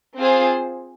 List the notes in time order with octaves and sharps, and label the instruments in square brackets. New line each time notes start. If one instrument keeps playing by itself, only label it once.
[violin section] C4 F4 G#4 C5